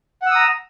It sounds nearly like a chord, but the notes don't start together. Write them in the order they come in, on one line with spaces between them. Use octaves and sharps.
F#5 E6 D#6 A#5